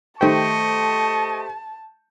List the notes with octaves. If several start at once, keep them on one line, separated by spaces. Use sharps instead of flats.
D#3 A3 G4 C5 D#5 G5 A5 C#6